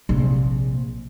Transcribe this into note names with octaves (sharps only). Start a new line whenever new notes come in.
A#1 C3